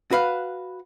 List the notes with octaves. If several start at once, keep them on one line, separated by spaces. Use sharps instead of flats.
F#4 B4 F5